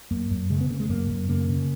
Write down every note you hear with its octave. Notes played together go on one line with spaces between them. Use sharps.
F#2 A#3
F#2
C#3 G#3
B3
C#3 A#3
G#3
F#2 A#3
F#2
C#3 A#3
C#3